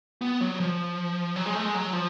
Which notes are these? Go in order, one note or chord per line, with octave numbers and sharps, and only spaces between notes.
B3
F#3
F3
F#3
G#3
A3
G#3
F#3
F3